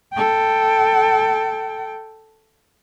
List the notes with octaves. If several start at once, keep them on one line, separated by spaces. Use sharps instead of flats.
A4 G5